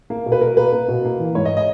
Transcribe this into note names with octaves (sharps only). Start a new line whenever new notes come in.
A#3
B2
B4
B2 A#4
A#3 B4
A#3
B2
A#3
E3
G#2 C#5
D#5
D#5